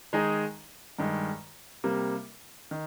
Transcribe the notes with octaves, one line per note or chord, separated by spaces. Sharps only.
D#3 G#3 D#4 G#4 D#5
G2 D#3 G#3
C3 G3 A#3
D#3